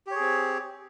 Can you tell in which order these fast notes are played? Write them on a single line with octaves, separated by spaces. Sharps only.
G4 C#5 G#4 C4